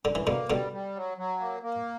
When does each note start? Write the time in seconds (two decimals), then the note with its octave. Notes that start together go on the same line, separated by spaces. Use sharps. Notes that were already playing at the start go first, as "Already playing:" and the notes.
0.05 F#2 D3
0.15 E3
0.27 B2 D3 A#3
0.50 B2 D3 G3
0.73 G3
0.95 F#3
1.18 F#3
1.40 A#3
1.63 A#3